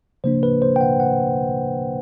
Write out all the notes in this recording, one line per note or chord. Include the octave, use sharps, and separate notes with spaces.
C#3 F3 A#3 D4 C5
B4
C5
G5
F#5
F#5